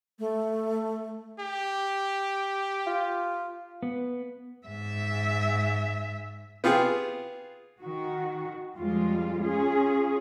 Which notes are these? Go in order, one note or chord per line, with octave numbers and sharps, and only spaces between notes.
A3
G4
F4
B3
G#2 E5
B3 F4 G4 G#4
D#3 F#4
F2 G3 G#3 F4
C#4 F4 G#4